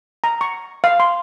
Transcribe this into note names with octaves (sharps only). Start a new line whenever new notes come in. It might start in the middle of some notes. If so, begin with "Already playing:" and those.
A#5
C#6
F5
C6